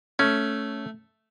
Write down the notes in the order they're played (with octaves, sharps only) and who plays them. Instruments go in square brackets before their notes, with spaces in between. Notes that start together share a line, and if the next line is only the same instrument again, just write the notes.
[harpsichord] A3 [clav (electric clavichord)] C#4